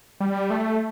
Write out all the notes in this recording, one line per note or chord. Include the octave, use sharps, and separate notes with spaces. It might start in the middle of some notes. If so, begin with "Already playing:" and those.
G3
A3